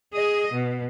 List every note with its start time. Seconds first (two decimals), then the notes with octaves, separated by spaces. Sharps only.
0.13 G#4 D#5
0.53 B2